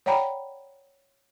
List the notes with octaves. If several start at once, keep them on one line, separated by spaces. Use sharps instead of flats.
C#5 D5 F#5 G5 A#5 B5